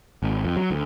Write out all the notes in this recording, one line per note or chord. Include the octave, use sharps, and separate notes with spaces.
G#1
F2
F#3
D2